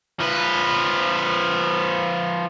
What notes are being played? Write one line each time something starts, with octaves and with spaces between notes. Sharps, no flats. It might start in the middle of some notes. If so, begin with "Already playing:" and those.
F3 B4